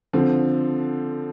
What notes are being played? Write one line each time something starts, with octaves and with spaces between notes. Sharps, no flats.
D3 F3 C4